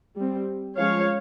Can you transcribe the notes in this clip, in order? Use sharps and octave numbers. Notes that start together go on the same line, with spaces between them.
G3 C4
F3 G#3 C#4 C#5 F5